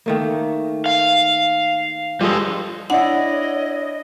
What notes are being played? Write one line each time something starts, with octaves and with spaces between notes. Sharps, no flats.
D#3 A3 A#3
F5
F3 G3 G#3 A4 D#5
D4 E4 C#5 D#5 F#5